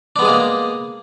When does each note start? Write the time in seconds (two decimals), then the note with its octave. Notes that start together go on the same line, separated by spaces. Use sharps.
0.16 D4
0.19 B3
0.22 G#3
0.25 G#4
0.28 A#3